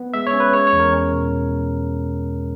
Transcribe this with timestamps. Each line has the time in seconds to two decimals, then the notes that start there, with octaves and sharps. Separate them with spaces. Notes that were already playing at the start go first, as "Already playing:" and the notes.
Already playing: B3
0.14 G#3 E5
0.27 C#5
0.33 C#4
0.40 B4
0.53 G#3 C#5
0.67 C#5
0.73 E2
0.80 A#4
0.93 C#4
1.12 B2